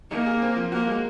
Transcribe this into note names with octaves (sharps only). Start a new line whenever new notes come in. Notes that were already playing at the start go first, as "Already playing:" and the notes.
A#3 D#4
G#4
C4
F3
A#3 F#4
G#3